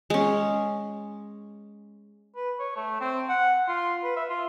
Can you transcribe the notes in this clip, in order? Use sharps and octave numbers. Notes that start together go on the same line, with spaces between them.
G#3 C#4
B4
C#5
A3
C4
F#5
F4
B4
E5
F4